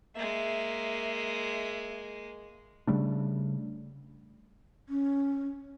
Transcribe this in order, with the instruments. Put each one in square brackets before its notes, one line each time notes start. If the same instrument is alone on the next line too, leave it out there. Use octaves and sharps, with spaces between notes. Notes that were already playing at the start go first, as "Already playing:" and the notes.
[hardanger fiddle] G#3 A#3 [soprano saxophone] E5
[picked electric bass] C#3 G3 A3 D4
[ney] C#4